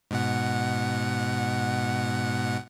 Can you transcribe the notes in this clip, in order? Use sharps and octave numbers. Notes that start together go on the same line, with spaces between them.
G#2 B2 F#5